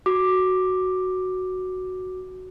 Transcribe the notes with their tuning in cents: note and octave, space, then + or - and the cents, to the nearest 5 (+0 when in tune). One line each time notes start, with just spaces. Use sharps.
F#4 +0 D6 +5